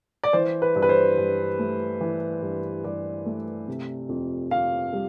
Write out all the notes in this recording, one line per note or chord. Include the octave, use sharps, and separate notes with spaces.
D5
E3 C5
B4
G2
B4
C5
G2
A3
E3
G2
G2 D5
A3
C3
F2
F2 F5
G3